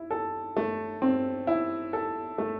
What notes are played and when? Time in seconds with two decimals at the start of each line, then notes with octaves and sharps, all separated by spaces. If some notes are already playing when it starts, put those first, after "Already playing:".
Already playing: E4
0.11 A4
0.57 A3
1.02 C4
1.47 E4
1.93 A4
2.38 A3